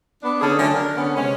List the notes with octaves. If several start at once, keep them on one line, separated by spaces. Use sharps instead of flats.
B3 D4
D3 C#4 D#4 G#4 A4
D3 D#3 F#3 A3 C#4
D4 A#4
D3 B3 C#4
C3 G#3 C#4